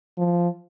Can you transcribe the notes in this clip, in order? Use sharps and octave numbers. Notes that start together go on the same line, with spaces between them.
F3